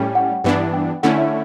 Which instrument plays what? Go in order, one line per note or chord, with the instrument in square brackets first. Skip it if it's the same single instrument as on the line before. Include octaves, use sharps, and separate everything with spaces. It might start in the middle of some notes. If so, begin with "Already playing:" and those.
Already playing: [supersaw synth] A2 G3 C#4 [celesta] G5
[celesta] F#5
[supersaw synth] G2 E3 B3 D4
[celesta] G5
[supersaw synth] D3 A3 C#4 E4 [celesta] F#5
[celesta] E5